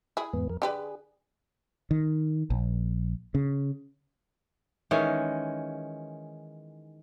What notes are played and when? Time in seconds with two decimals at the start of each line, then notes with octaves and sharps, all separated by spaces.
0.17 E4 G#4
0.33 E2 G#2 B3
0.49 F2 A#4
0.62 D3 G4 G#4 B4
1.91 D#3
2.50 A#1
3.35 C#3
4.91 D#3 E3 G#3 C#4